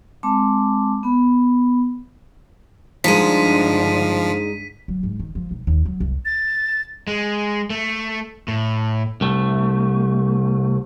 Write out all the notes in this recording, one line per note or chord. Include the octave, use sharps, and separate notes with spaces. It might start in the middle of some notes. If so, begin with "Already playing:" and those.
G#3 C4 A5 D6
B3 B5
G2 D3 F3 G#3 D#4 B6 D#7
F#3
G#2
D#3
F3
B1
D#2
F#3
C2
A6
G#3
A3
A2
C2 A3